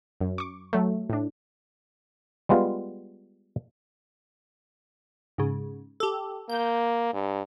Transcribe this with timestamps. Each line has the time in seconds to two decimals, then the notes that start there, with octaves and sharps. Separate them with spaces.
0.21 F#2
0.38 C#6 D6
0.73 F#3 A3
1.10 A2 D4
2.49 G3 G#3 B3 F4
5.38 G#2 C#3
6.00 G4 A4
6.50 A#3 G6
7.14 G2